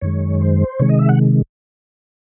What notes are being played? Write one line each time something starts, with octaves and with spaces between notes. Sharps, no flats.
F#2 D#3 G#3 C#5
C5
C3 D#3 G#3 C#5
D#5
E5
F#5